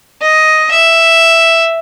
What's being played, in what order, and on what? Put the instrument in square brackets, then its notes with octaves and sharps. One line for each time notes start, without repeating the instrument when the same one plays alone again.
[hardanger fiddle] D#5
E5